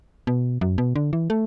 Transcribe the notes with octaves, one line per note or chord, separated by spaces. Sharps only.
B2
F#2
B2
D3
E3
A3